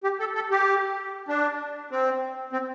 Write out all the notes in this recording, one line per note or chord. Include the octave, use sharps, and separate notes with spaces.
G4
A4
A4
G4
D4
C4
C4